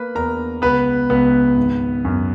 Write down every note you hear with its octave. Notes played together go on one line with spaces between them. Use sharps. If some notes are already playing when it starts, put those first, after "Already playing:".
Already playing: A#3 B4 B5
E2 A#4 A#5
C#2 B3 B4
C#2 B3 B4
G#1
F#2